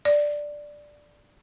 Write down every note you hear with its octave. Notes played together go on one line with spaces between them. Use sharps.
D5